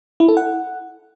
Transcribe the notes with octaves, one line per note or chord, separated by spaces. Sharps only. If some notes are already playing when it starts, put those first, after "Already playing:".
E4
A4
F#5